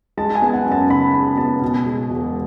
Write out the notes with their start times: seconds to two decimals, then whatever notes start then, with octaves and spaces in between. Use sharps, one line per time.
0.17 G#3 A5
0.35 G#5
0.42 B3
0.53 F#5
0.65 F#2
0.72 A5
0.89 C#3 B5
1.14 G#3 B5
1.38 B3 A5
1.62 B2
1.86 G#3
2.10 E1